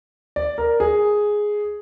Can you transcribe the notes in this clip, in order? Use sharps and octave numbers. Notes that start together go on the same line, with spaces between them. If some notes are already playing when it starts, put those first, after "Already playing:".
D5
A#4
G#4